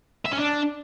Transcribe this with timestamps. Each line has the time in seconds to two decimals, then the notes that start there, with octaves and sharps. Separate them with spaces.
0.25 E5
0.32 C#4
0.38 D4